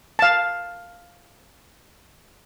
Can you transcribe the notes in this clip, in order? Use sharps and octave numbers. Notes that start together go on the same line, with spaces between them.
F5 A5